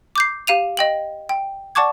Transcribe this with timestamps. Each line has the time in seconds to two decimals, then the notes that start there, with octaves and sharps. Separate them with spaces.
0.16 D6 G6 C7
0.47 G4 F5 D#7 F7
0.77 D#5 G5 F#7
1.29 G5
1.75 D5 F#5 A5 C#6 D6 G#6